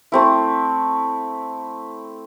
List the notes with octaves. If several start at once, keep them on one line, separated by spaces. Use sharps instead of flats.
A3 C4 E4